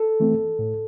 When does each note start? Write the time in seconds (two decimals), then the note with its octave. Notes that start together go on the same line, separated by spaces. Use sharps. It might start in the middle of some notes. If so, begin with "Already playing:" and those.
Already playing: A4
0.20 E3 A3 C4
0.59 A2